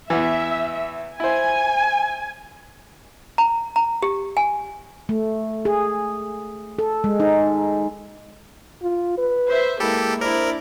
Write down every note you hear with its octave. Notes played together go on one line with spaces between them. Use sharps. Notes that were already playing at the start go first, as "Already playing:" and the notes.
E2 E3 E5
E4 C5 G#5
A#5
A#5
G4
G#5
A3
G#4
A4
G#3
D#4
F4
B4
C5 E5
G#3 A#3 E4 G4 A4
D4 E4 A#4 C5 D5